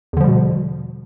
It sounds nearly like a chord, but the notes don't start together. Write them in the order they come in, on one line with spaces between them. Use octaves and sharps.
E2 D3 F3 G3 B2